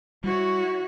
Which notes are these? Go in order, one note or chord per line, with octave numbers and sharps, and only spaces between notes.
G3 E4 F#4 C#5